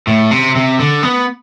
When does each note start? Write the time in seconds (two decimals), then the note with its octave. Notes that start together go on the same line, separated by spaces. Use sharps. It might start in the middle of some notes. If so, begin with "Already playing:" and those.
0.07 A2
0.31 C3
0.55 C3
0.79 D3
1.03 B3